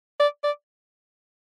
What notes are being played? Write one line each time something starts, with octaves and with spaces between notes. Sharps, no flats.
D5
D5